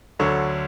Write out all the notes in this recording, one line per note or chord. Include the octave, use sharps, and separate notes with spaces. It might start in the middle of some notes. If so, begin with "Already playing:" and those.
D2 D3 F#3 C#5